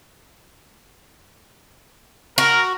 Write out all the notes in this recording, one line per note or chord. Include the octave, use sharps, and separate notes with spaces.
F#4 A#4